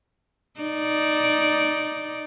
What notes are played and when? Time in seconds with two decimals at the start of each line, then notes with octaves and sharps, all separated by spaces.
0.60 D#4 D5